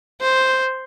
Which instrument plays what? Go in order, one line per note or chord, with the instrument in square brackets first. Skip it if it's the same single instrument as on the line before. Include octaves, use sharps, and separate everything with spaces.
[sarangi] C5